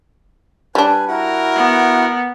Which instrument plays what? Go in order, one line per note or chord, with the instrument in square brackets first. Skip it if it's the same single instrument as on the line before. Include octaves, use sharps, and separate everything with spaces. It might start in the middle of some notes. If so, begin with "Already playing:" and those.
[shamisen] G3 D4 [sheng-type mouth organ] B4 G#5
[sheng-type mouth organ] E4 F#4 F#5 [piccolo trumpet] A#4
[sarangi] B3